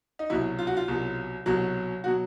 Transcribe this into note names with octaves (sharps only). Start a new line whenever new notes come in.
D#4
C2 B2 F#3 E4
F4
F#4
F4
C2 B2 F#3
C2 B2 F#3
B2 F#3 F#4